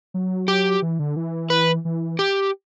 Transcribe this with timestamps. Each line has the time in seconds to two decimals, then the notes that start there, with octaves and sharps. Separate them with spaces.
0.14 F#3
0.48 G4
0.82 E3
0.99 D3
1.16 E3
1.50 B4
1.85 E3
2.19 G4